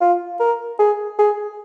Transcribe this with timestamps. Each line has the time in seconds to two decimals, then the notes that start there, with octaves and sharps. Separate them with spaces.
0.01 F4
0.40 A#4
0.79 G#4
1.19 G#4